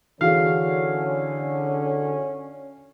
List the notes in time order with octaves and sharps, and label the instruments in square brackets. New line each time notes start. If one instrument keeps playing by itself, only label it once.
[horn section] D3 [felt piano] E3 F#4 G#4 [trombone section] C#4 [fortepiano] F5